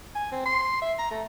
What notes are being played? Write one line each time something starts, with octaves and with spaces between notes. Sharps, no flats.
G#5
C4
C6
E5
A#5
A3